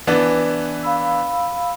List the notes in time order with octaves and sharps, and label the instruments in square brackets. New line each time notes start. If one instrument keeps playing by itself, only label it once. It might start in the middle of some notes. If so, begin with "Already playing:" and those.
[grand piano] E3 B3 D4
[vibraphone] F5 B5 E6